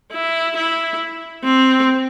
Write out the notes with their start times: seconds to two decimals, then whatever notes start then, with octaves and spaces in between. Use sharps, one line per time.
0.13 E4
0.57 E4
1.44 C4